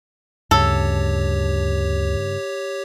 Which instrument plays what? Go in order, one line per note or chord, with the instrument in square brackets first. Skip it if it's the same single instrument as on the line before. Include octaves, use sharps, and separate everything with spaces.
[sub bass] D2 [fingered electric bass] G2 C#3 [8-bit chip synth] G4 C#5 [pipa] A4